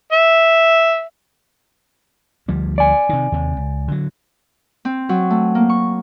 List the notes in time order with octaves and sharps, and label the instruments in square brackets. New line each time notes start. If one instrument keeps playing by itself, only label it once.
[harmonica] E5
[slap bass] D2 F3 G3
[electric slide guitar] D5 G#5
[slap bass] C3 D#3
D#2 C3
C#2
D3 F#3
[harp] C4
F#3
A3
A#3
C#6